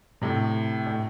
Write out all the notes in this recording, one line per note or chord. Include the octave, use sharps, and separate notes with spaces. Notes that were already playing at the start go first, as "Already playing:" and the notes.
A2 C3
A2